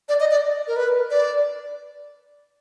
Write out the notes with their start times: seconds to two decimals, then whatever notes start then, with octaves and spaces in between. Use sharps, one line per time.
0.09 D5
0.20 D#5
0.31 D5
0.68 A#4
0.76 B4
1.10 D5